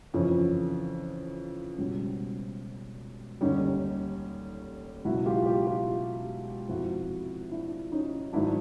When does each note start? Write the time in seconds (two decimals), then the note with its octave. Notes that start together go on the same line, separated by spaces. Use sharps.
0.14 F2 C#3 E3 C#4
1.77 C#2 B2 G3 C#4
3.41 D#2 D3 G3 C#4 D#4
5.05 C#2 B2 F#3 E4 F#4
5.25 F4 G4
5.46 F4 G4
5.67 F4 G4
6.69 F2 C3 F3 E4 F#4
7.51 D4 E4
7.92 C#4 D#4
8.33 G#2 D#3 F#3 D4 E4